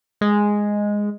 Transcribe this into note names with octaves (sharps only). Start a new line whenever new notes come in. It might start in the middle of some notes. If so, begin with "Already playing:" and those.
G#3